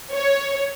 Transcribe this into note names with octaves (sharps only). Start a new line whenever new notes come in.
C#5